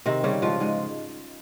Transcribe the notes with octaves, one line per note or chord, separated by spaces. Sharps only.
C3 D#3 C4
C#3 G3 C#4
G#2 F3 F4
G#2 G#3 G#4